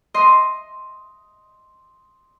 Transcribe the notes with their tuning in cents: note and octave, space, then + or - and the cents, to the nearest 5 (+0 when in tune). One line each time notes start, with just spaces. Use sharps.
D#5 +5 C6 +0